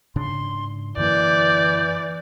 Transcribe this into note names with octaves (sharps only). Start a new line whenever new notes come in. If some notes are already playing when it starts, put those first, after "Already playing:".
G#2 C#3 D4 C6
F#2 D3 E3 A#3 D5 G6